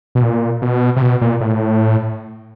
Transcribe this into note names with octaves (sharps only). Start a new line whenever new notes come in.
B2
A#2
B2
C3
B2
A#2
A2